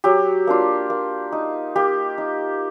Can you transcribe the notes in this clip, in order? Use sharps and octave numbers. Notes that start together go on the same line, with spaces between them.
F#3 G4
A#3 D4 F4
A#3
D#4
A#3 G4
D#4